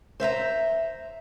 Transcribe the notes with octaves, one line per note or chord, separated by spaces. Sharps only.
C5 E5 F5 A#5